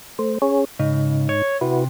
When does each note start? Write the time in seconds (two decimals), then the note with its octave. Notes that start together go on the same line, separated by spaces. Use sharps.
0.19 A3 C5
0.42 C#4 G#4 C#5
0.79 G#2 C#3 D#4
1.29 C#5
1.61 C3 E4 F#4 B4